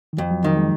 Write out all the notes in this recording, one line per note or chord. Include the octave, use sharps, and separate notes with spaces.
D#3
F2 F3
F#3
D#3 F#3
G#3